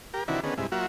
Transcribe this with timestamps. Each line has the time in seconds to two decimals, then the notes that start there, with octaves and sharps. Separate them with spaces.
0.14 G4 A#4
0.28 C3 D#3 E3 D4 E4 F#4
0.43 D3 D#3 B3 C#4 G#4
0.58 G2 C3 G#3 E4
0.72 F#3 A#3 F4 F#4 E5